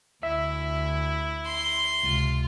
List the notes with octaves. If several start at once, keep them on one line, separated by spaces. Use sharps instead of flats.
D2 E4 E5
C6
C#2 C3 F4